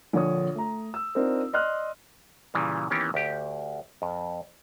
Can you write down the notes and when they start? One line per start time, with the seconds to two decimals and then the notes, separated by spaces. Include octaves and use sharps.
0.13 A#1 D3 C#5 D#6
0.55 A3 A#5
0.94 E6
1.15 C4 D4 D#4 F4 A#4 C5
1.53 D5 D#5 C6 F6 F#6
2.54 A#2 C#3 E3 G3
2.90 D#3 E3 A#3 B3 C#4 G4
3.14 D2 G4
4.02 F2